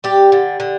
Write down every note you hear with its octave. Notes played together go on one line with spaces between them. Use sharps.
G3 G4
D3
D3